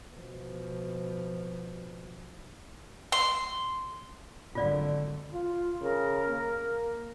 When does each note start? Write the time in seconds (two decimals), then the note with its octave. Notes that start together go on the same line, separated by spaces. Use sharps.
0.13 B2 F3
3.12 C6
4.55 G#1 F#2 D3 F4 D5 F5
5.33 F4
5.82 C#3 A#4
6.29 A#3